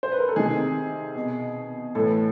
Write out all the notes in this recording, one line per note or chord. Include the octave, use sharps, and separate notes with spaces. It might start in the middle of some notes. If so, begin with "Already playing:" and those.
C5
B4
A#4
A4
C3 D#3 G#4
B2
A2 E3 A4